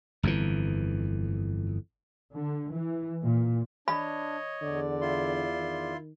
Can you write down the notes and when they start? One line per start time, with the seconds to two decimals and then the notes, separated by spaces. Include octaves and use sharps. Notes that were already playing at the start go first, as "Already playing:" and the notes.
0.23 G1 F2 B2 E3
2.34 D3
2.72 E3
3.23 A#2
3.88 D4 C#5 D#5 B5
4.62 E2 D3 D5
5.01 E4 F4 C6
5.57 D#3